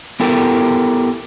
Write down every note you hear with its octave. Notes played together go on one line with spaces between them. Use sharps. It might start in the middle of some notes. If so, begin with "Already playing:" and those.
B3 E4 G4 A4 A#4